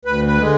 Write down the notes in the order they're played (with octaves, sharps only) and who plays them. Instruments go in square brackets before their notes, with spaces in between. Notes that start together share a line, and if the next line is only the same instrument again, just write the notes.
[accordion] D2 B4
B4
D3 G#3